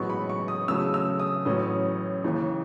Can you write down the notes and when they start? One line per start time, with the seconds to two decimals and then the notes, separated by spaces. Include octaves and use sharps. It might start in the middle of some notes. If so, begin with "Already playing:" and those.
Already playing: A1 G#2 F#3 B3 C#6
0.10 B5
0.29 C#6
0.48 D#6
0.68 E2 C#3 F#3 A3 C#4 E6
0.94 E6
1.20 D#6
1.45 A1 A2 F#3 C#4
2.24 D#2 C#3 E3